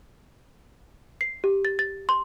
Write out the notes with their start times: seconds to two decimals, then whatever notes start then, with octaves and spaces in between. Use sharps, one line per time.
1.21 C7
1.44 G4
1.65 A6
1.79 A6
2.09 C6